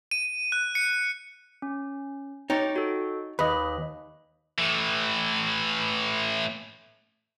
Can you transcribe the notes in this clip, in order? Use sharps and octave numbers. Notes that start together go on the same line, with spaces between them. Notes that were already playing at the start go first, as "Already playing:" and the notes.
D#7
F#6
C#7
C#4
D#4 C#5 G5 A6
F#4 A4
D#2 B4 D#5 B5
A2 E3